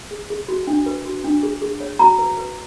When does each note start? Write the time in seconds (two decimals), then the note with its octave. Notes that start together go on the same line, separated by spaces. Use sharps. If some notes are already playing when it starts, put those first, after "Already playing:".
0.11 G#4
0.30 G#4
0.48 F#4
0.67 D4
0.86 B4
1.06 F#4
1.24 D4
1.43 G#4
1.62 G#4
1.80 C#5
1.99 F#4 A#5
2.19 B4
2.37 B4